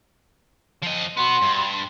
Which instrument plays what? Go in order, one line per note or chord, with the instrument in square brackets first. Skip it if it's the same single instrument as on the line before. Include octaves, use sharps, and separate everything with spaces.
[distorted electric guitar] F3 D#5
[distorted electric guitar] B3 F#4 [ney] C6
[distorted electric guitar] G2